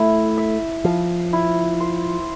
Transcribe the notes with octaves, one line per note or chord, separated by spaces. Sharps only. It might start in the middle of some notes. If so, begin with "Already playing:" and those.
Already playing: A3 E4
E5
F3 F5
E4
C5